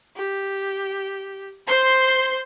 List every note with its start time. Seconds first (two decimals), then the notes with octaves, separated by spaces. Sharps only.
0.17 G4
1.67 C5 C6